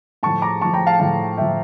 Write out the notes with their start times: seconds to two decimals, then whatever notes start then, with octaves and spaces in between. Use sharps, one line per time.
0.23 A2 F3 A5 C#6
0.42 A#5 D6
0.61 A2 F3 A5 C#6
0.74 G5 A#5
0.87 F5 A5
1.00 A2 F3 F5 A5
1.37 A2 F3 E5 G5